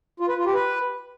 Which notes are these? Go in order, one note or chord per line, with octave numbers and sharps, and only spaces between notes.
F4
B4
F4
G4
B4